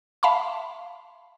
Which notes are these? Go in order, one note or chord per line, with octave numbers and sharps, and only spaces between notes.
E5 F5 A5 B5 C6